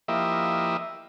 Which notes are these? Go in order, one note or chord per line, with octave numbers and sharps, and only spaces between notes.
F3 A#3 E4 G4 D#5 E5